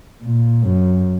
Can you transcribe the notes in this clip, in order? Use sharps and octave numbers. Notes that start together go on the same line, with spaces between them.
A#2
F#2